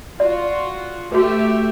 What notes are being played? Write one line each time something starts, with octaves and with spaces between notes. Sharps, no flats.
F4 F#4 D5
A3 F#4 G4 B4 E5